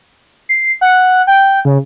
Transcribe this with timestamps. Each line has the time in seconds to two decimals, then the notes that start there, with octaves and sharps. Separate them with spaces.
0.49 C7
0.81 F#5
1.27 G5
1.65 C#3